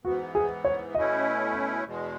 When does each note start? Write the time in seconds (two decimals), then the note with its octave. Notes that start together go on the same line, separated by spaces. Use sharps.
0.04 G#2 E3 B3 F#4
0.35 G#4
0.65 C#5
0.95 B2 A3 C#4 E4 D#5
1.84 E2 B2 G#3